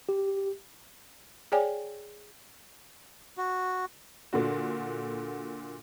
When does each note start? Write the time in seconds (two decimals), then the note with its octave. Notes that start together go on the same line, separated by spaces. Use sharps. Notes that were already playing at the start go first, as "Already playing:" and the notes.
0.09 G4
1.52 G#4 C#5 D5 G5 G#5
3.38 F#4
4.33 A#2 D3 F#4